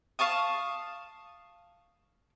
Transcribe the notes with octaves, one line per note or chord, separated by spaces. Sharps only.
F5 A5 C#6 D#6